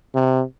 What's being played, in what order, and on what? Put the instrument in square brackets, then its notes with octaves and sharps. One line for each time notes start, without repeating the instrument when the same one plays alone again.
[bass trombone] C3